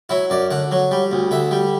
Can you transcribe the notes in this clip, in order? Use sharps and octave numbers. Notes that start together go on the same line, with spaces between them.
F#3 E4
F#2 D5
D3 F#5
F#3
G3
D2
D3 E5
G3